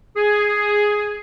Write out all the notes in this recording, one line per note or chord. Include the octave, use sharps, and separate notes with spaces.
G#4